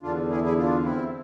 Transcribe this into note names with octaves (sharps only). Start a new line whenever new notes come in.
E2 D3 D4 F4
E4 G#4
E4 G#4
D4 F4
C4 E4